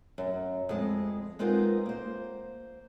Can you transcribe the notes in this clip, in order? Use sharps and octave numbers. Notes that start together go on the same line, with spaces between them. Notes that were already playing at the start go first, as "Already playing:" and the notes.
F#2
F2 G#3
G#3 B3 C4 D#4 F4 A#4
A#3 C5